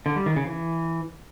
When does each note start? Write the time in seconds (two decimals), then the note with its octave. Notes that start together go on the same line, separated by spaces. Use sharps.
0.06 D3
0.16 G3
0.26 D#3
0.36 C#3
0.47 E3